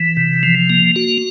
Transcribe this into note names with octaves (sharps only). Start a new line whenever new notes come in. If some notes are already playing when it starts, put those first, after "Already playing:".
Already playing: E3
C3
F3
A#3
F#4